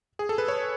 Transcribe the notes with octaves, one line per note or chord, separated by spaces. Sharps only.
G#4
A4
B4
C#5